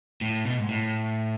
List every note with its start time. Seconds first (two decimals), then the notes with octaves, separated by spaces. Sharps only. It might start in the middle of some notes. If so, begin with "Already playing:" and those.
0.21 A2
0.45 B2
0.59 G#2
0.69 A2